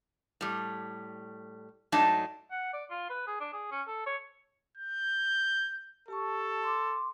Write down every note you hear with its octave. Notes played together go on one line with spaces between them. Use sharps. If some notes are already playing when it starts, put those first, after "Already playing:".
A2 G3
G#2 F#3 A3 D4 D#4 A5
F#5
D5
F4
B4
G#4
D4
G#4
C#4
A4
C#5
G6
G4 A4 A5 C#6
C6 D6